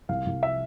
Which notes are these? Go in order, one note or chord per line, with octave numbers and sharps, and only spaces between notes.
C2 F5
C2
E5